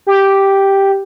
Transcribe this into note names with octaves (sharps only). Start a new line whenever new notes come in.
G4